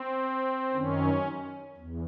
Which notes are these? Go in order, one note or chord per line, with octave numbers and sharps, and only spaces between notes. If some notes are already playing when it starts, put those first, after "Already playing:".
Already playing: C4
F#2 D#3 C#4
E2